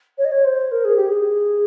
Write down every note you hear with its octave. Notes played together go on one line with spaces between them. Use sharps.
C#5
D#5
C#5
C5
A#4
G#4
G4
G#4